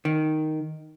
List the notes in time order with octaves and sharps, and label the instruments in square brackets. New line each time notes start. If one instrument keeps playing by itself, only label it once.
[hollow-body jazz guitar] D#3